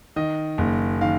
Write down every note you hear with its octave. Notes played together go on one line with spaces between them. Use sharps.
D#3 D#5
F#1
D#3 F5